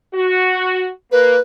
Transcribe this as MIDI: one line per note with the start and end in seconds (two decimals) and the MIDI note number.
0.14 0.88 66
1.12 1.35 58
1.12 1.40 71